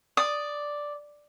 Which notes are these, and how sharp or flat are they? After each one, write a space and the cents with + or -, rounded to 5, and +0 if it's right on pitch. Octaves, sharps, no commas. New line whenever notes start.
D5 +0 D#6 -10